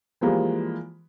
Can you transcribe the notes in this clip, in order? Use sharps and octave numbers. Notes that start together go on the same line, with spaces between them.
E3 F3 G3 G#3 A#3